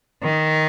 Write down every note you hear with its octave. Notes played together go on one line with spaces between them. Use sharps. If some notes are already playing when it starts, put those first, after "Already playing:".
D#3